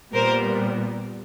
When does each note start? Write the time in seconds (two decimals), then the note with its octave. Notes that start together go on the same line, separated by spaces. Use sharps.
0.13 A#2 G3 B3 A#4 C5